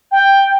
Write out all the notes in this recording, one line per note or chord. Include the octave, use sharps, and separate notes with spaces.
G5